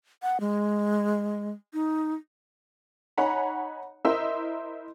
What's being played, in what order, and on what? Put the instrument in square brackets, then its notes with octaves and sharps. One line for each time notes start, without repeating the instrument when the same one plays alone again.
[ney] F#5
G#3
D#4
[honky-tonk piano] D#4 C#5 F#5 G#5 A#5 B5
E4 A#4 C5 D#5 E5